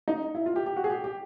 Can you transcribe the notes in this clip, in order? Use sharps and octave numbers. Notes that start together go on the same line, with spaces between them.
D#4
E4
F4
G4
G4
F#4
G#4
G4
G4